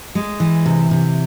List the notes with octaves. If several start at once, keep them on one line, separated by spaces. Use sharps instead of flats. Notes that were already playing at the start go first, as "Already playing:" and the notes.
G#3
E3
C3
C3